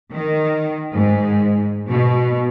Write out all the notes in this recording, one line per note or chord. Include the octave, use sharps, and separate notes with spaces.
D#3
G#2
B2